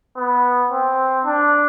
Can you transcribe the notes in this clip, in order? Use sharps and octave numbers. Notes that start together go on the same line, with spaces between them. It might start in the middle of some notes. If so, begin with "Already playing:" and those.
B3
C4
D4